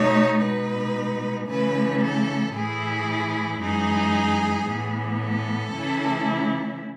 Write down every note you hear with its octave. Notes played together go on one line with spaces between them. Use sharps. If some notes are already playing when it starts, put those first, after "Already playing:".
Already playing: B2 A3 D#4 C#5
B2 G#3 D#4 B4
C#3 E3 A3 B4
A4
A2 E3 A3 E4 G#4
F#2 E3 G#3 D#4 G#4
A2 E3 B3
A4
C#3 E3 A3 C#4 E4